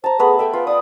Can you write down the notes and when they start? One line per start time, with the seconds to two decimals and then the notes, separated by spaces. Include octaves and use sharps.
0.04 C5 A5 A#5
0.19 A3 B3 G#4 B4
0.39 A4 E5 G5 G#5
0.53 F4 B4
0.67 D5 B5 D6 D#6